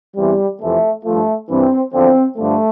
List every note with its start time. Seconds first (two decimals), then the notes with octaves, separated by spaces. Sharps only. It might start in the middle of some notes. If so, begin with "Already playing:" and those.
0.16 E2 C3 E3 G3
0.61 F2 C3 E3 A3
1.05 G2 F3 A3
1.49 G2 E3 C4
1.94 E2 D3 F3 C4
2.38 G2 D3 F3 A3